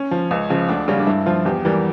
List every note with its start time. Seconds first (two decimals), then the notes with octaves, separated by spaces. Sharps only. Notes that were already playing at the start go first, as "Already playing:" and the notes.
Already playing: C#4
0.11 F3
0.31 C#2
0.50 C#3 F3
0.69 D2 D4
0.88 C#3 G3 C#4
0.99 D4
1.07 G2 E4
1.26 F3 F4
1.45 E2 G4
1.65 E3 G3 A#4